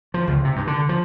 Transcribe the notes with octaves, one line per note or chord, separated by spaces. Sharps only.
F3
C#2
C3
G2
D3
F3